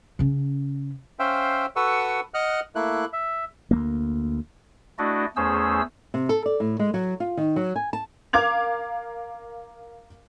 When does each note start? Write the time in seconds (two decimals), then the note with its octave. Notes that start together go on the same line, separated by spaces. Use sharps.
0.19 C#3 C#4
1.19 C#4 C5 E5 F5 G5
1.76 F#4 A4 B4 F#5 C#6 E6
2.34 D#5 F#5 F6 F#6
2.75 A3 A#3 E4 F#6
3.13 E5
3.71 D2 A3 A#3
4.98 A3 D4 E4 F#4 D5 D#5
5.36 E2 A3 C#4 G#4 C5 E6
6.14 C3
6.29 A4
6.46 D5
6.60 A2
6.79 G#3
6.94 F#3
7.20 F4
7.37 D#3
7.56 F#3
7.76 G#5
7.93 A5
8.33 A#4 F5 D6 G#6 F7